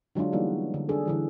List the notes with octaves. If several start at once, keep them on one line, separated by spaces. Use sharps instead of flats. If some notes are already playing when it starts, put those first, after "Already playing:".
D3 F#3 G#3 D4 F4
E3 G3 A#3 B3 D#4 F#4
D3
D4 G#4 A4
D3 E3 G3